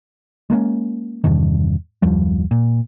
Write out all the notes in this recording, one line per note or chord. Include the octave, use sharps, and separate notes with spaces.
G#3 A#3 B3 C#4
E2 G2 C3 D#3
F#1 D#2 F3 G3
A#2